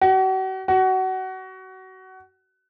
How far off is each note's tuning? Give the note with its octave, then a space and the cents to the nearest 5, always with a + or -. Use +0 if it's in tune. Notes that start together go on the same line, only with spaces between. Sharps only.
F#4 +40
F#4 +25